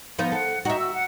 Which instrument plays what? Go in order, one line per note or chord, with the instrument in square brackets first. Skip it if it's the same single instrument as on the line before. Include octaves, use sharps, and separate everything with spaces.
[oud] F3 B3 D#4
[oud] A4 [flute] F#5
[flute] D#4 [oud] F#4 E5
[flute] E6
F#5